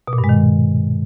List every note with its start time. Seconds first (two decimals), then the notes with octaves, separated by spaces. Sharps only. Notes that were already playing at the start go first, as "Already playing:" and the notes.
0.08 B2
0.13 A#2
0.18 G2
0.24 G#3
0.29 D#3